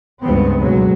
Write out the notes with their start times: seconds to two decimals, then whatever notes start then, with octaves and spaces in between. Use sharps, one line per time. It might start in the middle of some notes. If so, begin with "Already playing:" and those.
0.22 C#2 G2 B3 C4
0.60 D2 B2 F#3 G#3